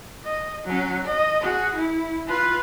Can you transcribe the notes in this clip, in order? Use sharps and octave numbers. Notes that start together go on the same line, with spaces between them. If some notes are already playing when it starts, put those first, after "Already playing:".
D#5
F#3 C#4
D#5
F#4 G#4
E4
F4 B4